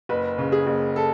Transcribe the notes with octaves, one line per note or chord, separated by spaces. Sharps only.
F#1 B4
C#3
G#4
F#1
A4